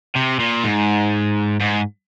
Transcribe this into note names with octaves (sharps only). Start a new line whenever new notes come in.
C3
A#2
G#2
G#2